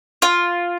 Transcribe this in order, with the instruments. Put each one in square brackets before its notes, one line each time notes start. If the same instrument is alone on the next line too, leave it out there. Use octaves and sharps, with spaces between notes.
[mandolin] F4